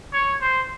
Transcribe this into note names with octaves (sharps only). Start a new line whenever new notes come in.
C#5
C5